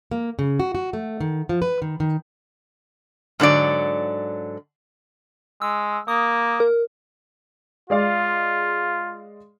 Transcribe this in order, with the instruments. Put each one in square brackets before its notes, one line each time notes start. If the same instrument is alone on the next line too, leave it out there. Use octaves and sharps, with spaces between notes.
[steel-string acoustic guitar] A#3
C#3
F#4
F#4
A3
D#3
F3
B4
D#3
D#3
[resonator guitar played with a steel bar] G#2 D3 F#3 D5
[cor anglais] G#3 [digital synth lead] E6
[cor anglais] A#3 [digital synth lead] D#6
[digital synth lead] A#4
[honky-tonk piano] G#3 D5 F5 [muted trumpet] F4